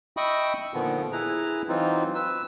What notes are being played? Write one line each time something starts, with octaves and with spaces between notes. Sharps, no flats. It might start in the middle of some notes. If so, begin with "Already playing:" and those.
D#5 E5 G5 B5 C#6 D#6
A#2 D3 D#3 F3 B3
E4 G#4 B4 A#5
E3 F#3 C4 D#4 F4
B4 E6